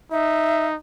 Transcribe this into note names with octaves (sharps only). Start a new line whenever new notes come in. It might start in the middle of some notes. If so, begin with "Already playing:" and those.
D#4 E5